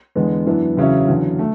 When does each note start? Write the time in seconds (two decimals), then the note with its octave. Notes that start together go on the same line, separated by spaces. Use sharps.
0.15 E2 D3 G#3 B3
0.47 F#2 E3 B3 D4
0.77 E2 C#3 F#3 C#4 E4
1.08 E2 D3 F#3
1.39 A3